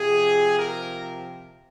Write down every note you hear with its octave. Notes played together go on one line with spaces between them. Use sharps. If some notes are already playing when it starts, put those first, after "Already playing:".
Already playing: C3 F3 G#4
A#4